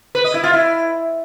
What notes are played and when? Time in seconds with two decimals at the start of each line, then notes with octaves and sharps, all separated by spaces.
0.15 B4
0.24 D#5
0.34 E4
0.44 F4
0.53 E4